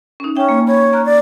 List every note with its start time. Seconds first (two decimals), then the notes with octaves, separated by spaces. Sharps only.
0.20 C#4 D#4
0.36 C#4 E5 G5
0.49 A#3 G#5
0.67 C#5 B5
0.93 A#5 F6 F#6
1.06 D5